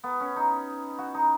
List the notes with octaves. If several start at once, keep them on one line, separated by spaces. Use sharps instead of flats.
B3
C#4
D#4
F#4
D#4